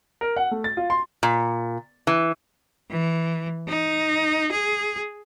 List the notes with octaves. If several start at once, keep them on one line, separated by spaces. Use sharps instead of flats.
A#4
F#5
A3
A6
F4
C6
A#2
E3
E3
D#4
G#4